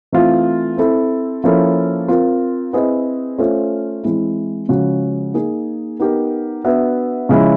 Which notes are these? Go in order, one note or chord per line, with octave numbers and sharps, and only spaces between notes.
E3 A3 C4 F4
C4 E4 A4
F3 A#3 C#4 E4 A4
C4 F4 A#4
C4 E4 G#4 B4 D#5
A3 C#4 F4 A4 C5
E3 G#3 C4 E4
C#3 F3 G#3 C#4 F#4
A#3 D#4 G#4
B3 D#4 G4 A#4
B3 D4 F#4 B4 E5
C#3 F3 G#3 C#4 E4